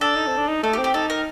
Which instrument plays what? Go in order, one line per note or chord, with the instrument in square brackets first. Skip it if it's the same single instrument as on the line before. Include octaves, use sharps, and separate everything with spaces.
[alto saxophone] D4 [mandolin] A4
[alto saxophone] D#4
C4
D4
D#4
[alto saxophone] A3 [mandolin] A4
[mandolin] G4
[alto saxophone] C4
[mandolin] G4
[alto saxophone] D#4 [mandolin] A4
[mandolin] A#4